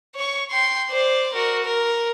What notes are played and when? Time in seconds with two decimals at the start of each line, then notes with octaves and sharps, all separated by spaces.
0.15 C#5 C#6
0.51 G5 C6
0.90 C5 D5
1.34 F#4 A#4
1.64 A#4